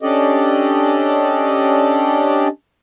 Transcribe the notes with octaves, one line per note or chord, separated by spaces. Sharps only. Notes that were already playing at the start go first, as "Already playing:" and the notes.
C#4 D4 G4 A4 D5 D#5